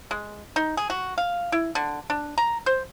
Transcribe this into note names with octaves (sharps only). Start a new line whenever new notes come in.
G#3
D#4
G#4
F#4
F5
E4
D3
D4
A#5
C5